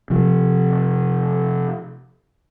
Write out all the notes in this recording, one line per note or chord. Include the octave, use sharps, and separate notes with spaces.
C3 F3